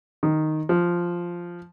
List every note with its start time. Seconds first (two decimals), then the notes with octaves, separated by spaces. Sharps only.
0.23 D#3
0.69 F3